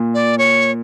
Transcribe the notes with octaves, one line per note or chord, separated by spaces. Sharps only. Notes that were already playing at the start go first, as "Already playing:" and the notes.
Already playing: A#2
D5
C#5